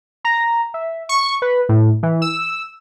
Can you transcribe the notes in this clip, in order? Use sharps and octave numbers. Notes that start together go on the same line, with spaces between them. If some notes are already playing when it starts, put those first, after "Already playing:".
A#5
E5
C#6
B4
A2
E3
E6